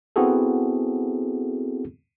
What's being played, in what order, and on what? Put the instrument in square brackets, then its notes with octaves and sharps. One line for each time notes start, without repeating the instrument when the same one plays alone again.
[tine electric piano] B3 C4 E4 F#4 G#4 A4